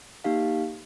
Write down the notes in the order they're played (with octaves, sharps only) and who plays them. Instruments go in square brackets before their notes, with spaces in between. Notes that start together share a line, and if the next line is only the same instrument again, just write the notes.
[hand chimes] A#3 D#4 G4 F5